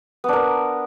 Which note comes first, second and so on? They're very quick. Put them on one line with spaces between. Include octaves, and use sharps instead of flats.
B3 D4 A#4